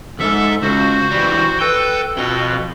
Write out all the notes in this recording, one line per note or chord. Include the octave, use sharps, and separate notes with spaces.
D#2 G#2 A4 E5
C#2 F#4 C5
E3 G3
A4 B4 G5
F2 B2 G5